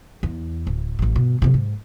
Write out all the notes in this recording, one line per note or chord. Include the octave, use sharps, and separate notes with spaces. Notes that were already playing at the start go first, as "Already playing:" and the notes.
E2
D1
A1 E2
G2 B2
F2 C3
G#2